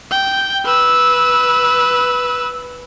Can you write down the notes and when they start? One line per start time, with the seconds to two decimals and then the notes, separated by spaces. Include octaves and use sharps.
0.11 G5
0.65 B4 E6